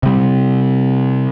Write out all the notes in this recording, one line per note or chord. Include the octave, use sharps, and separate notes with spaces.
C3 G3